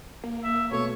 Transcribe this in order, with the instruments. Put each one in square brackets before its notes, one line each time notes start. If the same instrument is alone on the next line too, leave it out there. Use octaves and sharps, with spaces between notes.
[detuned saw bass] A#3
[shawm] E5
[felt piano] B2 A3 [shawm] C#5